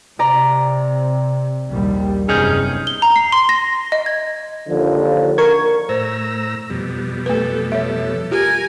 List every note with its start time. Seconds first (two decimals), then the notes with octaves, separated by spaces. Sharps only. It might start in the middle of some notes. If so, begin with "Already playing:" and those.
0.19 C3 D5 A#5
1.69 A#1 D#2 G3
2.29 F#1 E2 C3 C#4 D#4 G#4 F6 G6
2.87 G7
3.02 A#5
3.16 C7
3.32 C6
3.49 A#6
3.92 D#5
4.06 G#6
4.68 D#2 D3 F3
5.38 A#4 C#6 G#6
5.89 A2 C5 A#5 E6
6.70 F2 B2 G3
7.26 A3 A4 B4
7.72 A4 C#5 E5
8.31 F4 G4 A#4 G#5